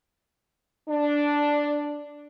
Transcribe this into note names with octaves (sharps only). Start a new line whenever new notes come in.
D4